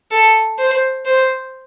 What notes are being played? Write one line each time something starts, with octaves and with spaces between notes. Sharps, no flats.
A4
C5
C5